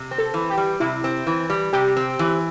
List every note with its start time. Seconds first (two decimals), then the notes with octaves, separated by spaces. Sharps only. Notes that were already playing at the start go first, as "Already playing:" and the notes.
Already playing: C3
0.11 C4
0.18 A4
0.34 E3
0.50 G4
0.58 G3
0.80 C3 E4
1.04 C4
1.27 E3
1.50 G3
1.73 C3 G4
1.97 C4
2.19 E3